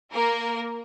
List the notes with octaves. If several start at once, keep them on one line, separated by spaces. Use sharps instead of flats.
A#3 A#4